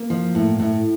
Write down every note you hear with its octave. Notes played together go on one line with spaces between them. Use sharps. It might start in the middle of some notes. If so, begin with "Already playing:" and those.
Already playing: A#3
F3
A2
A2